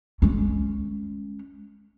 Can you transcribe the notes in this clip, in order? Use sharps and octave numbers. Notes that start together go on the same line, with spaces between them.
G#3 C#4